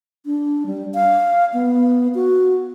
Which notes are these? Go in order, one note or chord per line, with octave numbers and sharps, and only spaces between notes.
D4
G3
F5
B3
F#4